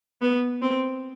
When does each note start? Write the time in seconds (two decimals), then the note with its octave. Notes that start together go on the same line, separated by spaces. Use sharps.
0.22 B3
0.62 C4